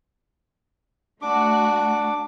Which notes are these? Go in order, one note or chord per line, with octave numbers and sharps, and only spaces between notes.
A3 D4 F#4 F#5 D6